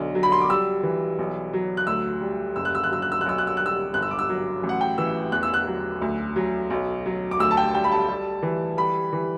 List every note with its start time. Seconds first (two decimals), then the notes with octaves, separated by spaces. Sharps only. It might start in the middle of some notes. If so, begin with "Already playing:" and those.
Already playing: B1 D3
0.15 F#3
0.23 B5
0.32 C6
0.41 D6
0.49 G3 E6
0.83 E3
1.19 B1
1.53 F#3
1.77 F#6
1.87 D2 E6
2.21 G3
2.56 F#1 E6
2.65 F#6
2.75 E6
2.84 F#6
2.91 F#3 E6
3.02 F#6
3.12 E6
3.21 F#6
3.26 B1 E6
3.38 F#6
3.47 E6
3.57 G3 F#6
3.66 E6
3.94 G1 F#6
4.02 E6
4.11 D6
4.19 E6
4.29 F#3
4.63 A1
4.69 F#5
4.81 G5
4.98 E3 E6
5.32 E2 F#6
5.43 E6
5.54 F#6
5.67 F#3
6.02 D2
6.36 F#3
6.70 B1
7.06 F#3
7.31 D6
7.40 D2 E6
7.51 A5
7.57 G5
7.74 G3 G5
7.84 B5
7.92 A5
8.08 G3
8.43 E3
8.77 G3 B5
9.13 E3